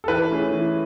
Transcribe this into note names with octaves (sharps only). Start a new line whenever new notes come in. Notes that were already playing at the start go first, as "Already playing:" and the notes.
A4
E3 B4
A3 C#4 G#4
E3